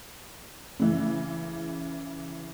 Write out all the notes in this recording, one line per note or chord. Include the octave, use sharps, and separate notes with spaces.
C#3 E3